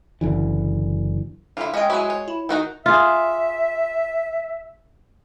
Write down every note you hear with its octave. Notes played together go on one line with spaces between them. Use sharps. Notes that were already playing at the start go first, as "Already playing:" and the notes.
F#1 D3 E3
D3 E4 F4
G#3 A#3 C#4 D#5 G5
F#3 E4 F#4 G#5
C#5
E4
D#3 D#4 F#4 A4
F4 G#4 E5